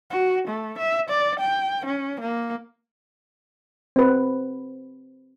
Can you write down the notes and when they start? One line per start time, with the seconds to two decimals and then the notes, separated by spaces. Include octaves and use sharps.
0.10 F#4
0.48 A3
0.78 E5
1.09 D5
1.40 G5
1.86 C#4
2.21 A#3
3.96 C4 B4